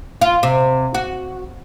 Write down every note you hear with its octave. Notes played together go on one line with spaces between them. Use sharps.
F4
C3
F#4